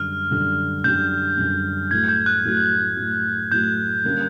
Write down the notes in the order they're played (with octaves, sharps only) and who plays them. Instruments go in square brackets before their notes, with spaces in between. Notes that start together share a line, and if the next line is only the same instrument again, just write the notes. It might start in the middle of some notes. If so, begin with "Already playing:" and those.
Already playing: [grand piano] F#2 D3 G3 [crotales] F6
[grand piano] F#2 D3 G3
[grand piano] F#2 D3 G3 [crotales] G6
[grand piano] F#2 D3 G3
[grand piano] A2 F#3 A3 [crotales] G#6
[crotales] G6
F#6
[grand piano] A2 F#3 A3
A2 F#3 A3
[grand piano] A2 F#3 A3 [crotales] G6
[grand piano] D3 G3 A#3 C#4